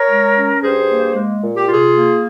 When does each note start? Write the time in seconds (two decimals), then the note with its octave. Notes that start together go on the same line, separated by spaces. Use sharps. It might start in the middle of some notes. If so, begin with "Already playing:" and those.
Already playing: A#4 C#5
0.10 G#3
0.36 C#4
0.63 G2 G#4 C5
0.89 A#3
1.15 G#3
1.42 A#2
1.56 G4
1.68 C3 F4 G#4
1.95 A#3